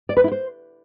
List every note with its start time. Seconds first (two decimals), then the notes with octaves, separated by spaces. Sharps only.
0.09 D5
0.17 B4
0.24 E4
0.32 C5